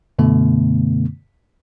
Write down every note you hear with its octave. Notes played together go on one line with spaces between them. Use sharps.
F#2 B2 D3 A3 B3